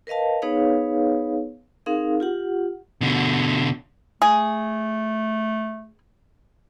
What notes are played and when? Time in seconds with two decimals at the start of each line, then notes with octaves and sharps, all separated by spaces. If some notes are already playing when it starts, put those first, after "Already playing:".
0.07 A#4 B4 D#5 F5 A5
0.42 B3 D#4 G#4 B4 C#5 F5
1.86 C4 D#4 G#4 A#4 F5
2.20 F4 G4 F#5
3.01 B2 D3
4.22 A3 G#4